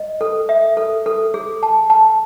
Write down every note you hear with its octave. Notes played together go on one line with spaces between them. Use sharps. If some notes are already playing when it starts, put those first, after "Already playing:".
Already playing: D#5
A4
E5
A4
A4
G#4
A5
A5